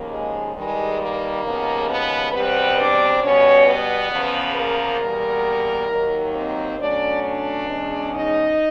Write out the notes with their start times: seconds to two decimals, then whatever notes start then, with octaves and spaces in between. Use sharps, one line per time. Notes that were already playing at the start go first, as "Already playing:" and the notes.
Already playing: D#2 C#3 F3 A#3
0.09 G#3 G#4
0.54 G2 D#3 G3 G#3 G#4
1.00 A#3 A#4
1.43 D#2 C#3 F3 G#3 B3
1.88 B3 B4
2.32 E2 B2 G3 B3 C4 B4
2.77 D4 D5
3.22 B2 G3 B3 C#4 C#5
3.66 B3 B4
4.11 E2 C#3 F3
4.56 A#3 A#4
5.01 E2 B2 G3 A#3
5.89 D#2 D#3 F#3 A#3
6.34 C4 C5
6.78 B2 F#3 A3 C#4 D4 D5
7.23 D4 D5
7.68 E2 B2 G#3 C#4
8.13 D#4 D#5